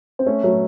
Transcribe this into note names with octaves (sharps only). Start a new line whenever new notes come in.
C4
A3 C#4
F#3 A3